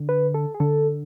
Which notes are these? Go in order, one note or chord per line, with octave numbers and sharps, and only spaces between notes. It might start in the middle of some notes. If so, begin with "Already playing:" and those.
Already playing: D3
B4
A4
G#4
D3 A4